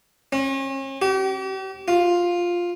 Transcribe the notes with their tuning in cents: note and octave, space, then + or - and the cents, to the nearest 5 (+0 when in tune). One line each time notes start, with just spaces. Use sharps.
C#4 -40
G4 -40
F4 +5